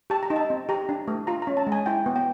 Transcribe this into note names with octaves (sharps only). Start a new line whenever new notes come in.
G4 A5
A#5
D#4
A5
C4
G4 A#5
D4
A3
F4 A#5
A#5
C#4
A5
G#3
G#5
E4 G5
B3
G5